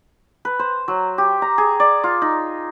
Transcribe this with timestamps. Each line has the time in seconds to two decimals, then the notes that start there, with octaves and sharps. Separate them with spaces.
0.45 B4
0.59 C5
0.88 F#3
1.18 G4
1.42 A#5
1.58 G#4
1.80 D5
2.04 F4
2.22 D#4